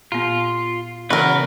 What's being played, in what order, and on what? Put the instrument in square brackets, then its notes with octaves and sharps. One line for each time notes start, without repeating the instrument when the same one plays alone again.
[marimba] A#2 B3 [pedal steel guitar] F4
[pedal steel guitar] C#3 B3 B4 [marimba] E3 F#5 [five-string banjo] F#4 A#4